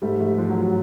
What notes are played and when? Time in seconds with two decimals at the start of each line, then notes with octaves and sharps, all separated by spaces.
0.02 G#2 G3 A3
0.20 F3 G3 A3
0.38 F3
0.50 F#3
0.56 F3
0.62 F#3